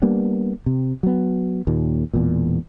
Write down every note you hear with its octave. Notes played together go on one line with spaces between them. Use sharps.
G3 A#3 B3 D4
C3
F#3 B3
D#2 A#2
E1 E2 A#2